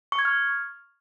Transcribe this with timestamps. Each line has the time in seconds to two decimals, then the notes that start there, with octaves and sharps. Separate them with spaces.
0.12 C#6
0.19 G#6
0.25 F6